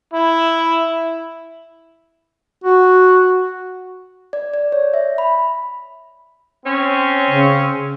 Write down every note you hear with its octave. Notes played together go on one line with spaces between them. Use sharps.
E4
F#4
D5
D5
C#5
E5
B5
C4 C#4
C#3